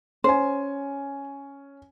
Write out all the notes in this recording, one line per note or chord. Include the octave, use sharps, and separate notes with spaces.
C#4 C5 G#5